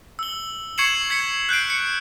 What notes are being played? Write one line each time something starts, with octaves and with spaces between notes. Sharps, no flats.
E6 G7
C#6 G#6 C7 C#7 E7 F#7
G#6 B6 C#7
F#6 G6 C7 D7
C#7